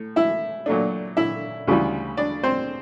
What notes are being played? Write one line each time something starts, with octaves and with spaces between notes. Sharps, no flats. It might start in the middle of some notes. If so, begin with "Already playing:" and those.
Already playing: A2
E4 E5
A#2 F#3 A3 D4
E4 E5
D2 C#3 E3 G3
D4 D5
C4 C5